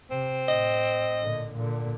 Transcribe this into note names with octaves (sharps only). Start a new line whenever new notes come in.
C3 C4
A2 D#5
A#2 D3
A#2 D3